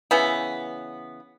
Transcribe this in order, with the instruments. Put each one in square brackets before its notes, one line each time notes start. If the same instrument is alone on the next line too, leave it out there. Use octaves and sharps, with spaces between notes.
[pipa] C#3 E3 B3